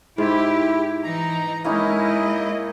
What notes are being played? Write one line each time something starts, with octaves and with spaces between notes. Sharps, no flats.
G#2 E4 G4
E3 D#4 A#5
G#3 A#3 C#4 D#4 E4 D#5